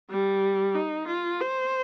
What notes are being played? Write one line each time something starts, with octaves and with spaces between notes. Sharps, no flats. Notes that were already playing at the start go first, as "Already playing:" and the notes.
G3
D#4
F4
C5